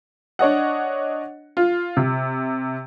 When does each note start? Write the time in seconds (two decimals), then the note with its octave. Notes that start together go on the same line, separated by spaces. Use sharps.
0.39 D4 C#5 D#5 F#5
1.57 F4
1.97 C3